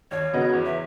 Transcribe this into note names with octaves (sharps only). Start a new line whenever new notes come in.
D#2 C#5
C#3 F#3 B3 D#4
E2
E5